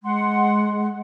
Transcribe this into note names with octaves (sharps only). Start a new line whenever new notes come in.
G#3 F#5 C6